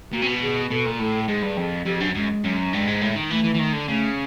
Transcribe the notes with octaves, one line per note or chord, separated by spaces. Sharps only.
A#2 F#4
C3
B2
G#4
B2 A4
A#2
A2 A4
G#2 G#4
G2
F2
F2 G4
F#2 D4
F#2 G#3
F#2
G2 G#3
G#2
A2
D#3
E3 A3
E3
E3
D#3
D3
C#3 A3